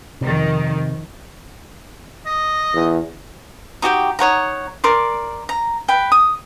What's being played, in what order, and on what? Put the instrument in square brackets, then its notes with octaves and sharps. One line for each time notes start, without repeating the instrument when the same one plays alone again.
[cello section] F2 D#3 [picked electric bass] C3
[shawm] D#5
[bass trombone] E2
[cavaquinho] D#4 F#4 G4 G5
D#4 C#5 F#5 A#5
A#4 D5 C6
A#5
B4 G5
D#6